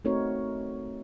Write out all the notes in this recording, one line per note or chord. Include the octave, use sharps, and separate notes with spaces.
A3 C4 D#4 F#4 A#4 C#5